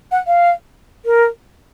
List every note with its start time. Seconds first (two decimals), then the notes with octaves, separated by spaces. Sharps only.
0.12 F#5
0.27 F5
1.05 A#4